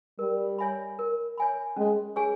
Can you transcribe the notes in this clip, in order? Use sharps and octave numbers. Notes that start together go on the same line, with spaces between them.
G3 A#4
C#5 E5 G#5 B5
A#4
C#5 E5 G#5 B5
G#3 C#4
G#4 C#5 G#5 C#6